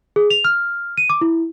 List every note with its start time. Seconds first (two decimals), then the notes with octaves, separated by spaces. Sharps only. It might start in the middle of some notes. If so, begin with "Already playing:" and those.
0.16 G#4
0.30 F7
0.45 F6
0.98 D#7
1.10 D6
1.21 E4